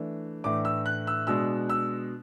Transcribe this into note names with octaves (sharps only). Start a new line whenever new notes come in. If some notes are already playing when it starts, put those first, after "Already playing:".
Already playing: E3 A3 D4
A2 E3 A3 D4 D6
E6
F#6
E6
B2 G#3 D4 E6
E6